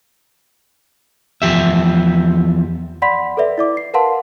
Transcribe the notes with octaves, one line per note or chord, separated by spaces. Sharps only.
E2 F3 G4 E5
D5 F#5 B5 C6 B6
A4 B4 D5 E5
E4 D5 D6
C7
A#4 B4 F5 F#5 A5 C6